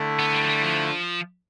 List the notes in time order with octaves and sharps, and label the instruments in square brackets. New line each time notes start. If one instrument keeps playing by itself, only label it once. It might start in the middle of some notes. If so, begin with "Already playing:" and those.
Already playing: [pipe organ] D3 A3 E4
[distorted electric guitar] B3
G3
F3
G3
F3